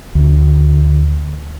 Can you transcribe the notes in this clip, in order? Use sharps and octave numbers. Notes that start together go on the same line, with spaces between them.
D2